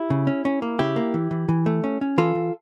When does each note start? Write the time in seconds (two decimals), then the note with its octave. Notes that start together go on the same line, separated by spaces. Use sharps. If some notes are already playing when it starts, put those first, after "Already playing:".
Already playing: E4 G4
0.10 C#3
0.27 C#4
0.45 C#4
0.62 A#3
0.79 C#3 E4 G4
0.96 A#3
1.14 E3
1.31 E3
1.49 E3
1.66 A3
1.84 C#4
2.01 C#4
2.18 E3 F4 A4
2.35 E3